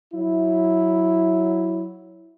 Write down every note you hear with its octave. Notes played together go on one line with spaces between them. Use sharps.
F#3 E4